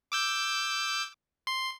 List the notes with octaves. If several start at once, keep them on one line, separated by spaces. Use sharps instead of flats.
D6 E6 G6
C6